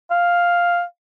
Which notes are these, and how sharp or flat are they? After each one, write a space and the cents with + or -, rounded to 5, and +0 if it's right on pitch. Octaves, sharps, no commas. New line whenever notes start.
F5 +0